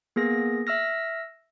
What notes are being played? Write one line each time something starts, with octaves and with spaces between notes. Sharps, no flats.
A#3 B3 G#4 A#6
E5 E6 F6 A#6